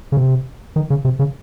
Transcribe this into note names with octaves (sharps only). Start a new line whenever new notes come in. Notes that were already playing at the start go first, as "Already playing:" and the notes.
C#3
C3
D#3
C#3
C3
C#3